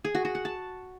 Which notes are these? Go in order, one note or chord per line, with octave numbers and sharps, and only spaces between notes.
G#4
F#4
F#4
F#5
A5